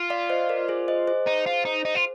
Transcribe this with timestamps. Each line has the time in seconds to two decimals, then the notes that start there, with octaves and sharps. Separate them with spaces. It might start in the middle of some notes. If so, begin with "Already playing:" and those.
Already playing: F4
0.10 D5 F5
0.30 C5 D#5
0.49 A#4 D5
0.68 G#4 C5
0.88 C5 D#5
1.07 G#4 C5
1.27 D#4
1.46 F4
1.65 D#4
1.85 D#4
1.95 F4